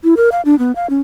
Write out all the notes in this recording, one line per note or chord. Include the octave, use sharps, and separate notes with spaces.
E4
A#4
F5
D4
B3
F5
C#4